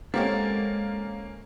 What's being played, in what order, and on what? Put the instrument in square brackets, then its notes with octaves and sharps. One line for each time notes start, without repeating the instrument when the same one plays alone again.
[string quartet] G#3 [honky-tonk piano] A#3 C#4 [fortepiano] C4 G4 A#4 [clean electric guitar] A4 F#5